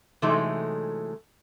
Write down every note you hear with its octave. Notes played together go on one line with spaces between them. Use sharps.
C3 E3 F#3 G#3 A3 D#4